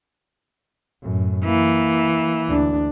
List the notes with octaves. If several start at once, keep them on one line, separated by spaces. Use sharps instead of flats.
F#2 A2
E3 A#3
D2 D4